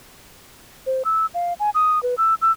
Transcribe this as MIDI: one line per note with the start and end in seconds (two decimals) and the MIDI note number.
0.86 1.03 72
1.05 1.26 88
1.34 1.53 77
1.60 1.70 80
1.75 2.02 87
2.03 2.15 71
2.18 2.34 88
2.42 2.52 88